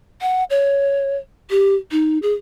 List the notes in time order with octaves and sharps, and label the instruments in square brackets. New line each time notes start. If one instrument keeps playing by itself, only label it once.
[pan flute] F#5
C#5
G4
D#4
G#4